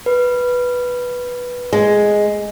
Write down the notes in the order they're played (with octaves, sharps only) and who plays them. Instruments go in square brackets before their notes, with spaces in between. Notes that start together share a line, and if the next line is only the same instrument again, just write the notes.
[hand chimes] B4
[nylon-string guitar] G#3